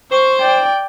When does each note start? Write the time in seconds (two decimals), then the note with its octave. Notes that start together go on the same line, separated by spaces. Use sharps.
0.12 C5 C#6
0.41 D5 G5